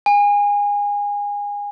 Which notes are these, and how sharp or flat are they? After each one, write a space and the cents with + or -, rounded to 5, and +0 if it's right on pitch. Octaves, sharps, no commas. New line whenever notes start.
G#5 -25